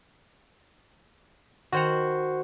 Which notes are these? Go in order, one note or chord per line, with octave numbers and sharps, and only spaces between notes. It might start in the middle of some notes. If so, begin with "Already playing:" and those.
D#3 F#4 C5 F#5 A#5